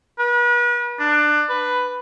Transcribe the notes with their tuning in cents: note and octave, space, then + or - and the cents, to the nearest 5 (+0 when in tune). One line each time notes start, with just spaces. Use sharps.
B4 -40
D4 +20
B4 +5